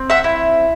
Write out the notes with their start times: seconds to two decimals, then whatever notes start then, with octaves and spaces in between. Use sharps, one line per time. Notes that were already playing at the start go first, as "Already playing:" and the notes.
Already playing: C4
0.10 E5 F#5
0.24 E4